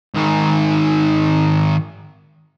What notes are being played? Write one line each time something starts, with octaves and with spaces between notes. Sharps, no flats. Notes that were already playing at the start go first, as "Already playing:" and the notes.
G#2 D#3